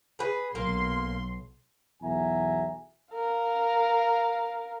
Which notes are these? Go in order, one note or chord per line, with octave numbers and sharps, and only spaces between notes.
G#4 B4
B1 A#3 C6
B1 E2 F#4 E5 G#5 A#5
A#4 F5